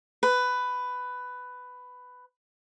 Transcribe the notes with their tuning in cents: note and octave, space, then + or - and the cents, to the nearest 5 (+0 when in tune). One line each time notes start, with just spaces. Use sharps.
B4 +10